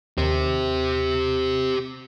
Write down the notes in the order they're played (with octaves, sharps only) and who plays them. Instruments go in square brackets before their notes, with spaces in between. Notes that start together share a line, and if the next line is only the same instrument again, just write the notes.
[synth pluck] D#2 [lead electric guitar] G4 C5